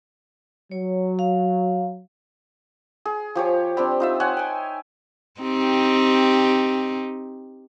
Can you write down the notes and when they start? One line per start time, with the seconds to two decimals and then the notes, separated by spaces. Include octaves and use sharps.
0.71 F#3 C#5
1.19 F5
3.05 G#4
3.35 F3 G4 C#5
3.77 G3 C4 D4
4.00 D#4 F4 E5
4.20 C#5 F#5 G#5
4.37 G5 G#5
5.41 C4 D#4 G4